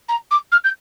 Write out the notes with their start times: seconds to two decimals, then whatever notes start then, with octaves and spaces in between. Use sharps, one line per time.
0.08 A#5
0.31 D6
0.52 F6
0.64 G6